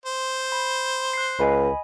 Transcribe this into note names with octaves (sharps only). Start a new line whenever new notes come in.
C5
B5
F#6 C7
C#2 D#5 G#5 B5